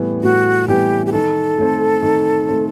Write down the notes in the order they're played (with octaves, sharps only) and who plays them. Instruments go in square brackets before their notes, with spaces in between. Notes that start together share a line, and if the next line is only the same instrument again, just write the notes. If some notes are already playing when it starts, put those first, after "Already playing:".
Already playing: [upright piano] A2 E3 G3 B3
[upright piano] A2 [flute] F#4
[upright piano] E3 G3 B3 [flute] G4
[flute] G4
[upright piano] D#3 [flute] A4
[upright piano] A3 C4
D#3
A3 C4